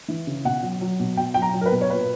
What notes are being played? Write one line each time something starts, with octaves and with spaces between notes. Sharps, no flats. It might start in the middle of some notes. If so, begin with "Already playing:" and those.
E3
C#3
B2 F#5
F#3
F#3
B2
B2 G5
F#3 G5
A#5
F#3
A#4
B4
B2
C#5
A#2 B4